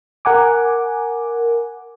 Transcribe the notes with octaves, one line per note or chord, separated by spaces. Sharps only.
A#4 F#5 G#5 D6